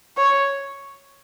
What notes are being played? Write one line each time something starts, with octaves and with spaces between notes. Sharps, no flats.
C#5